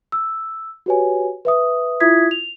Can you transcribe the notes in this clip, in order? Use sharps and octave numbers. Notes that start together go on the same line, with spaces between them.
E6
F#4 G4 B4 C#5 G#5
B4 E5 D#6
E4 F4 E5 D#6 G#6 B6
F7